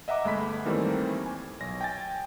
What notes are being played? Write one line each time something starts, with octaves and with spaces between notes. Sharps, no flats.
D#5 E5 F#5 A#5 D6
G1 G#3 A3 B5 B6
D#3 E3 G3 A3 A#3 C4
G#5
B1 A#6
G5 G#5 A6